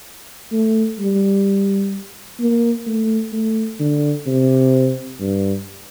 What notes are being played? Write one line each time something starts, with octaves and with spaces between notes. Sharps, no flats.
A3
G3
A#3
A3
A3
D3
C3
G2